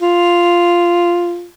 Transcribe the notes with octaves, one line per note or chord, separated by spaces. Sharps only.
F4